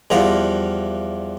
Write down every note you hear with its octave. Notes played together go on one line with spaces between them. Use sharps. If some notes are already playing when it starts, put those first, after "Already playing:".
E2 F3 G3 A#4 F5 F#5